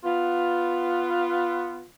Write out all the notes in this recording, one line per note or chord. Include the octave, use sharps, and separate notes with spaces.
B3 F4